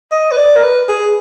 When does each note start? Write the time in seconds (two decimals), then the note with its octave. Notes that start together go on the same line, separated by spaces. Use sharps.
0.12 D#5
0.32 B4
0.37 D5
0.56 A#4
0.63 B4
0.89 G#4